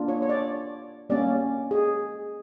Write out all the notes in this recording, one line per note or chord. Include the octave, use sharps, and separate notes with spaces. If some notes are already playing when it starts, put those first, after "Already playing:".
Already playing: A#3 D4 F4
C#5
C#5
D5
G3 A#3 C#4 D5
G#4